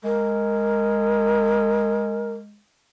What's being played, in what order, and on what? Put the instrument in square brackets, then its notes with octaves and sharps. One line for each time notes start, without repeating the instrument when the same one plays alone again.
[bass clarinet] G#3 [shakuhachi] A#4